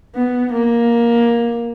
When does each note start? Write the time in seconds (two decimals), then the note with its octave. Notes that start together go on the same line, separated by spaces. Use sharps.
0.15 B3
0.53 A#3